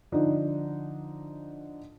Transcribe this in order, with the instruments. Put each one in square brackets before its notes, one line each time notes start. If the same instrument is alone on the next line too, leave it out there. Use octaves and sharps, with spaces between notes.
[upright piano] D3 F3 D4 D#4